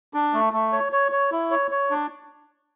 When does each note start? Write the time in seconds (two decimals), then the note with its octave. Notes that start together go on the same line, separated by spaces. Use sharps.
0.14 D4
0.33 A3
0.53 A3
0.73 C#5
0.92 C#5
1.12 C#5
1.32 E4
1.51 C#5
1.71 C#5
1.91 D4